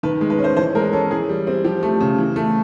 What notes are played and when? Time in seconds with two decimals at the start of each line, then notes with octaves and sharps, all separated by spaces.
0.03 D#3 B4
0.21 G#3
0.30 B4
0.39 C#4
0.44 C5
0.56 E3 C5
0.75 G#3 A#4
0.93 C#4 A4
1.11 E3 G#4
1.29 G3
1.47 C4
1.64 F3 G4
1.83 A3
2.00 C#3
2.18 E3
2.36 A3